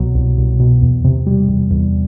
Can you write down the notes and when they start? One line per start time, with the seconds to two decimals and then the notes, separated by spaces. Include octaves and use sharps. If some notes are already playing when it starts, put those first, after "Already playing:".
Already playing: C2 B2 F#3
0.15 C2
0.38 C2
0.60 B2
0.82 E2
1.05 C3
1.27 G3
1.48 E2
1.71 E2